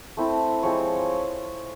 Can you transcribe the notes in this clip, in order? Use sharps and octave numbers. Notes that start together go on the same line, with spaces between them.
A3 C4 E4
F3 G#3 C4 C#5